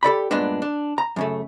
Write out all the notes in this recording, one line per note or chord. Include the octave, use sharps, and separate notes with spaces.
G4 A4 D5 B5
G2 A#2 G#3 B3 D4
D4
A#5
F#2 C#3 A3